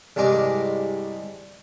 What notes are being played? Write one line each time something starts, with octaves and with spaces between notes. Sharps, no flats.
C2 G2 G#3 A#4 D6